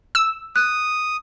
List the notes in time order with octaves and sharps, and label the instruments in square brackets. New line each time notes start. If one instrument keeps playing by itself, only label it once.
[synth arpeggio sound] E6
[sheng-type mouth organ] D#6 [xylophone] F#6